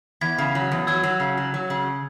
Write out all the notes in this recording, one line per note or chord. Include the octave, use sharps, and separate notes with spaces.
E2 G#6 B6
C#3
F#3
E2
F#3 E6 G#6
F#3
C#3
F#3
F#3
C#3